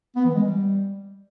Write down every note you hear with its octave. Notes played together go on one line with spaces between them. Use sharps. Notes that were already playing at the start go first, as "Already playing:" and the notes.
B3
E3
G#3
G3